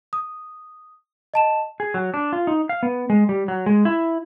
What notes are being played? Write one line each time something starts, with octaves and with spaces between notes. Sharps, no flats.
D#6
D#5 A5 E7
G#4
F#3
D4
F4
D#4
F5
B3
G#3
G3
F#3
G#3
E4